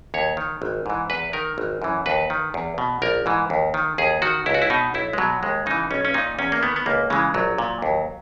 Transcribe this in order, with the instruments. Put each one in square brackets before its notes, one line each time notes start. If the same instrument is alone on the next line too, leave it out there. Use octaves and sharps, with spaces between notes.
[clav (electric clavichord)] D#2 C#5
D#3
G#1
G#2 E3
E2 B4
D#3 A#4
G#1
F#2 E3
D#2 B4
D#3
E2
B2
A#1 A#4
G#2 E3
D#2
D#3
D#2 G#4
D#3 F#4
C#2 E4
F#4
E4
B2 D#4
B1 E4
G#3
B2 F#3
D#2 G#3
C#3 E3 D#4
B1 C#4
C#4
A#2 D#4
E2 C#4
A#3
D#3 B3
B3
C#2 A#3
C#3 E3 G#3
A#1 F#3
A#2
D#2